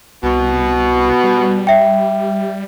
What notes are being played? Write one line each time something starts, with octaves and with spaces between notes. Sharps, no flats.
C2 B2
G3
E5 G5